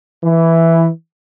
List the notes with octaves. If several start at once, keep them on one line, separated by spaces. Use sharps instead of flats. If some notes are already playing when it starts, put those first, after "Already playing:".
E3